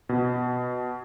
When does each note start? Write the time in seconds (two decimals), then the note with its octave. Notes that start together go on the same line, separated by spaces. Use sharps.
0.09 B2